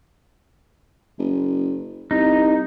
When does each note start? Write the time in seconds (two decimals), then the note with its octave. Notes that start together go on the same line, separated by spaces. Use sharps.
1.19 F#1
2.11 C2 D#4